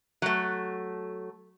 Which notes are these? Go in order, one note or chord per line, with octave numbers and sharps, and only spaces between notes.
F#3 A3